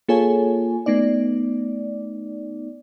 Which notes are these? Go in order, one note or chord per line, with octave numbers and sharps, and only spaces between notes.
A#3 F4 G#4 A4 C#5 G#5
A3 B3 D#4 D5